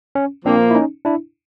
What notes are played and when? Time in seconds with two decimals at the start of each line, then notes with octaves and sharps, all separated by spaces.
0.15 C#4
0.45 A#2 F3 A#3 C4 D4
0.71 E4
0.75 C#4 D#4
1.05 D4 E4